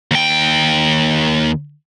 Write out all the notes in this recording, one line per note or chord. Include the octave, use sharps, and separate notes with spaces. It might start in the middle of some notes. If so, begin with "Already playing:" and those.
D#2 G5